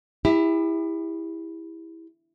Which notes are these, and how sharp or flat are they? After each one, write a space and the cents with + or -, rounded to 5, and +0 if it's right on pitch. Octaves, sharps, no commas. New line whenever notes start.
E4 -5 G4 +40